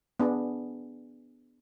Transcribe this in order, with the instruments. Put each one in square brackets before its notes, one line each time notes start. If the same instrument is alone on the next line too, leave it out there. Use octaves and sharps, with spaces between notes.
[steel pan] B3 D4 G#4